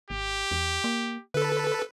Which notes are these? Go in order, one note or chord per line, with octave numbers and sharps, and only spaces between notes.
G#1 G4
E2
A#3
D3 A4 B4